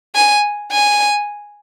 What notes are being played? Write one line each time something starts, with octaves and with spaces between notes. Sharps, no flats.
G#5
G#5